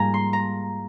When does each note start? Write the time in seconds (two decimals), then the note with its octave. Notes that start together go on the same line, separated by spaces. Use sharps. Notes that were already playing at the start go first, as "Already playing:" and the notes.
Already playing: G#2 G3 A#3 F4 G#5 A#5
0.14 C6
0.33 A#5